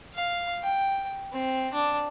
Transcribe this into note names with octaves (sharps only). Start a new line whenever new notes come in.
F5
G5
C4
D4